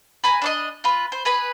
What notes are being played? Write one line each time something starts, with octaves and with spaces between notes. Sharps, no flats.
B4 G#5 A#5
D4 D5 D#5
F4 B4
C5
G#4 B4 B5